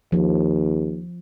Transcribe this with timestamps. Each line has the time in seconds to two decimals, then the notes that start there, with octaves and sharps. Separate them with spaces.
0.12 D#2 F3